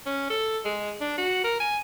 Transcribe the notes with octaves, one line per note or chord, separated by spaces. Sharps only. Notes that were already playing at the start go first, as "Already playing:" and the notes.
C#4
A4
G#3
D4
F#4
A#4
G#5